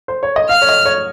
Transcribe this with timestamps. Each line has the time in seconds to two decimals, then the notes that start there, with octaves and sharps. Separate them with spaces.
0.08 C5
0.23 C#5
0.36 D#5
0.49 F5 F6
0.62 C#5
0.69 D#5
0.86 C#5